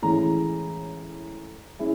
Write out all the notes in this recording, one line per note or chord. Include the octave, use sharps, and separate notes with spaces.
A2 E3 G#3 C#4 A#5
G#3 C#4 E4